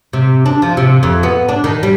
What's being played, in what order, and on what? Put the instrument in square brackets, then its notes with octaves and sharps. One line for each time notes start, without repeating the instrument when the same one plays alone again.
[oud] C3
D4
F3
C3
F2
B3
D4
D#3
G3